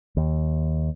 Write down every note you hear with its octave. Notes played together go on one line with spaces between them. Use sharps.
D#2